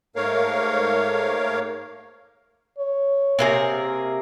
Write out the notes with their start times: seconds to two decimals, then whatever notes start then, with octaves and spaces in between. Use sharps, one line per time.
0.16 G#2 A3 A#3 A#4 C#5 F5
2.78 C#5
3.39 C3 A#3 G#4